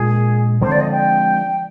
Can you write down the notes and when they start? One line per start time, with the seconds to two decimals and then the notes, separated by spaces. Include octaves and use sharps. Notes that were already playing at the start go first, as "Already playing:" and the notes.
Already playing: A#2 G#3 D4 G#4
0.61 D3 F3 G#3 C4 C5
0.72 D5
0.81 D#5
0.92 G5